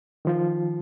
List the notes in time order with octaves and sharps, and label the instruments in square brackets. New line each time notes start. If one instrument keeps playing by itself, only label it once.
[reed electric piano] D#3 F3 F4